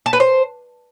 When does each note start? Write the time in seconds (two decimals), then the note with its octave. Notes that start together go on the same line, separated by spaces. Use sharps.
0.06 A5
0.13 B4
0.20 C5